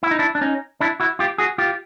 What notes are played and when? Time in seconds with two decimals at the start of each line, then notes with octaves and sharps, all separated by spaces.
0.03 E4
0.11 D#4
0.19 D4 E4
0.35 D4
0.41 C#4 D#4
0.81 D4 E4
1.00 E4 F#4
1.19 F4 G4
1.38 F#4 G#4
1.58 F4 G4